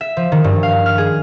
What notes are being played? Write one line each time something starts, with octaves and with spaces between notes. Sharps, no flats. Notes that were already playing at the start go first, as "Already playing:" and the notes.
E5
F3
D#3
G2
F5
F6
G#4